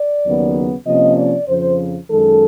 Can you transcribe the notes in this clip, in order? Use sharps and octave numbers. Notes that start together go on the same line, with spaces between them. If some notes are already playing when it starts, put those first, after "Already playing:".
Already playing: D5
D#2 C#3 F#3 B3
C3 F3 A#3 C#4 D#5
D5
F2 C#3 F3 C5
F#2 D#3 G#3 A4